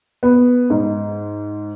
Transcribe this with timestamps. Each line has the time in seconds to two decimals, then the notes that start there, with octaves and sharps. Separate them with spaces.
0.23 B3
0.70 G#2